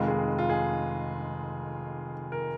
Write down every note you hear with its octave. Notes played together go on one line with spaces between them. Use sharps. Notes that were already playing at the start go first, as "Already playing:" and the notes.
Already playing: F1 F2 D#3 G#3 F4
G#4
F4
G#4
A#4